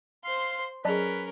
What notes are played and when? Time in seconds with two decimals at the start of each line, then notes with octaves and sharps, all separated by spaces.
0.24 C5 F5 C6
0.85 F#3 C#4 G#4 A#4 B4 D5 D#5 A5